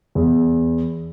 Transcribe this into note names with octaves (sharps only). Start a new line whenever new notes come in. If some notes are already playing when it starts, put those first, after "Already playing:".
E2